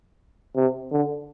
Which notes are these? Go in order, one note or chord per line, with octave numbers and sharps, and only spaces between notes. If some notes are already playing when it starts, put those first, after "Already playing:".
C3
D3